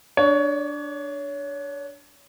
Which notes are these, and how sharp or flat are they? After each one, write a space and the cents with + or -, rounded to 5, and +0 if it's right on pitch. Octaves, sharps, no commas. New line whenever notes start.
D4 +0 C#5 +25